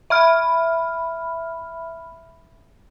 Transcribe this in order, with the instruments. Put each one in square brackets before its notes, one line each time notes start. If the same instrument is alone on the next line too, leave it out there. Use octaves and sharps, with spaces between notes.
[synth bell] E5 B5 F6